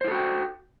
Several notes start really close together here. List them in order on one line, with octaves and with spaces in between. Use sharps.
C5 E4 A4 F#4 G5